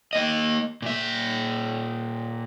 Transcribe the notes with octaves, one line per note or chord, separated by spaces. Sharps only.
A#3 D#5
A#2 E5